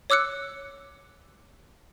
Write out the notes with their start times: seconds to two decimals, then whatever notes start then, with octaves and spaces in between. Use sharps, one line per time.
0.10 C#5 D6 E6 F#6 C#7